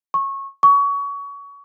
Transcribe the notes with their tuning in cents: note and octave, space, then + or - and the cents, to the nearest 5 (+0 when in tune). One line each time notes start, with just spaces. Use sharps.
C#6 -20
C#6 +25